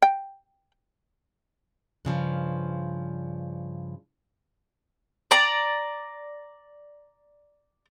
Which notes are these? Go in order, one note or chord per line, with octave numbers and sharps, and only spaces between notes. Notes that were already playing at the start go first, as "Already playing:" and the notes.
G5
G2 C#3 F3
D5 A#5